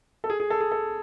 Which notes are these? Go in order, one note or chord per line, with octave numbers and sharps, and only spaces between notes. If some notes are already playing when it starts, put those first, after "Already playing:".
A4
G#4
G#4
A4
G#4
A4